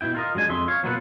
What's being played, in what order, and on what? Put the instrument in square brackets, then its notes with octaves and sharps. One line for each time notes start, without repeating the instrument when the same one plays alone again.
[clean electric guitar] B2 E4 G5
F4 A#4 D#5
F#3 G#3 D4 G#5
F2 G#3 E5 C6
C#5 F5
B2 F#3 A#3 F4 B4 F#5